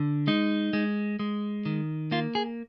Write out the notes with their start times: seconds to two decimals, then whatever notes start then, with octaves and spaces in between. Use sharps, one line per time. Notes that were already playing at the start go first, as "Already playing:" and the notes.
Already playing: D3
0.27 G#3 D#4
0.73 G#3
1.19 G#3
1.66 D#3
2.11 A#3 F4
2.35 G#4